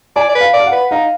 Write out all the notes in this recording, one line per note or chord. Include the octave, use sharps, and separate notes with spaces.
D5 G#5
D5
B4
F5
D5
F5
F#5
B4
D#4 F5